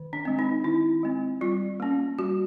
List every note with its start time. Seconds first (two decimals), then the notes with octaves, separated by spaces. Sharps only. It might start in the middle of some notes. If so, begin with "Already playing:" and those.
Already playing: D#3
0.13 D4
0.25 G#3 C4
0.39 D#4
0.64 D#3 E4
1.03 G#3 C4
1.41 G3 F4
1.80 A#3 C#4
2.18 G3 F#4